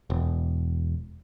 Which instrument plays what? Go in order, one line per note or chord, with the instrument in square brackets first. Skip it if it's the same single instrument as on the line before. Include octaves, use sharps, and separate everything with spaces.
[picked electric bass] E1